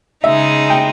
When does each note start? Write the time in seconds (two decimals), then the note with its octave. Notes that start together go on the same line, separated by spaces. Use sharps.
0.24 C#3 G#3 D#4 E5
0.70 G5